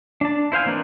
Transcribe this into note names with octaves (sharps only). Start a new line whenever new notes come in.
D4 A5
E4 C5 F5 G#5
E3 A#3 C4 D4 D#4